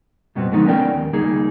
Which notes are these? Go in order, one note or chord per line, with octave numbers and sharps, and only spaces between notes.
F#2 B2 G3 B3 C4
D3 F3 G#3 A3 B3 D#4
B3 C#4 A#4 D5 G5
D#2
C#2 G3 A#3 D#4 G#4